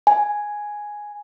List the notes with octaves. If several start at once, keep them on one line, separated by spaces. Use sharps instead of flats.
G#5